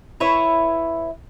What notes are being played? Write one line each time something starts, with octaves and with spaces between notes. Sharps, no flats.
E4 B4 C#5 E5